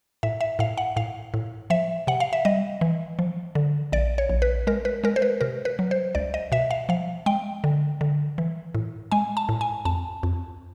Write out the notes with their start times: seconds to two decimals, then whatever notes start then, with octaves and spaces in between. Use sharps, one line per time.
0.23 A2 E5
0.41 E5
0.59 A2 F5
0.77 F#5
0.96 A2 F5
1.34 A2
1.70 F3 E5
2.07 C3 F#5
2.20 F5
2.33 E5
2.45 G3 D#5
2.81 E3
3.19 F3
3.55 D3
3.92 A#1 D5
4.18 C#5
4.30 A#1
4.42 B4
4.67 G#3 A#4
4.85 B4
5.04 G#3 A#4
5.16 C5
5.22 B4
5.41 C3 A#4
5.65 B4
5.79 F#3
5.91 C5
6.15 C#2 D5
6.34 D#5
6.52 B2 E5
6.71 F5
6.89 F3 F5
7.26 G#3 G5
7.64 D3
8.01 D3
8.38 E3
8.75 A2
9.12 G#3 G#5
9.37 A5
9.49 A2
9.61 G#5
9.85 F2 A5
10.23 F2